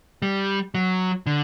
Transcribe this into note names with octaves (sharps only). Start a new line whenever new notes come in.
G3
F#3
D3